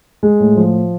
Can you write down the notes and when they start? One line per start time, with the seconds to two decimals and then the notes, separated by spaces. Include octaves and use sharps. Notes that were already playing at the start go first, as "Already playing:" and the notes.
0.23 G#3
0.40 A2
0.57 F3